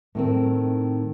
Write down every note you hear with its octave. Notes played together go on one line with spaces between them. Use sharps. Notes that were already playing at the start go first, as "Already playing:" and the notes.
A2 D#3 C4